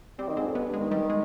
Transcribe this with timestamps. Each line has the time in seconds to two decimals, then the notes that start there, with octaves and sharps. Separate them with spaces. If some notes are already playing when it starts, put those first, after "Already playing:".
0.18 G3 C4
0.28 D#3
0.37 G#2 C4
0.46 F2
0.55 G2 B3
0.67 G2
0.74 G#3
0.79 D#3
0.91 D#3 G3
1.10 G#3